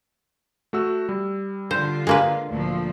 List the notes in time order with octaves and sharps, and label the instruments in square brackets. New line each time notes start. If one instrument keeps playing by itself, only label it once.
[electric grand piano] A3 F#4 E6
G3
[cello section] D3 F4 [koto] C5
[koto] G#3 A#3 B4
[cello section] D2 A#2 F3